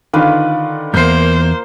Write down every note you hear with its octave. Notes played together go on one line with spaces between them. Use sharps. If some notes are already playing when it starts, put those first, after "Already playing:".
D3 D#3 F4 B4 D6
E2 G2 A#3 A#4 C5 G6 C7